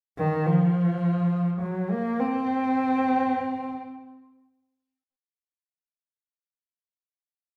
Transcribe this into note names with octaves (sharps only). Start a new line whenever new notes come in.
D#3
F3
F#3
A#3
C4